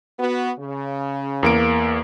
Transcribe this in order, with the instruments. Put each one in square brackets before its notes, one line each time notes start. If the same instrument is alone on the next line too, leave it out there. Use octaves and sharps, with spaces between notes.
[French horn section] B3 F#4
C#3
[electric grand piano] E2 A#3 D7